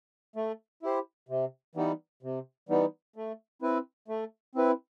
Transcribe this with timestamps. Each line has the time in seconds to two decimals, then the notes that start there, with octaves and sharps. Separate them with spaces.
0.36 A3
0.83 E4 G4 C5
1.29 C3
1.75 E3 G3 B3 D#4
2.23 C3
2.69 E3 G3 B3 D#4
3.16 A3
3.62 C4 E4 B4
4.08 A3
4.55 C4 E4 B4